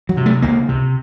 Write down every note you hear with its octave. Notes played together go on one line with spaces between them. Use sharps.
F#3
C3
A3
C#2 A#3
C3